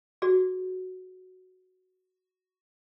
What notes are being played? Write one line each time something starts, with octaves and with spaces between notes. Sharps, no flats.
F#4 G#4 D5